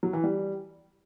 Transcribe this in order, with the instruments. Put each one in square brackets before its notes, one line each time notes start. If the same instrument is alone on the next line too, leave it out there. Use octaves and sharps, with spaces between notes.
[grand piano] F#3
E3
G3